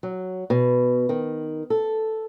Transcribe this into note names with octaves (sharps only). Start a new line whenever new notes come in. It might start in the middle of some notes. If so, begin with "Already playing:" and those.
F#3
B2
D#3
A4